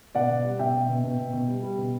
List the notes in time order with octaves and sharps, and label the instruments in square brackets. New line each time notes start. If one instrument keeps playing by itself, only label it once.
[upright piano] B2 D5 F#5
B2
G3
B2 E5 G5
B2
B2
B2
B2
B2
G3
G3
B2